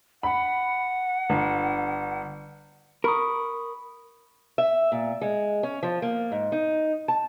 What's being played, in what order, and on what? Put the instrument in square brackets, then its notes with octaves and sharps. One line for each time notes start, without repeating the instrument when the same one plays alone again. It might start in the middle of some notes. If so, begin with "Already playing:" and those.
[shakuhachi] F#5 [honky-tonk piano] B5
[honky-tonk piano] G1
[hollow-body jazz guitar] A#4 [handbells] B5 C#6 D#6
[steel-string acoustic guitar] E5
A#2
G#3
C#4
F3
A#3
G#2
D#4
A5